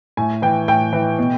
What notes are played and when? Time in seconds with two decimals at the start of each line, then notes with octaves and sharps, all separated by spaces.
0.17 A2 G#5
0.42 E3 G5
0.68 A2 G5
0.93 E3
1.19 B2